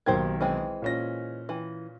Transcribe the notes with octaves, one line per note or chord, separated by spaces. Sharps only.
B1 D#3 A#3 G4 C5 G#6
E3 G#3 C4
A#2 C#4 A#6
E3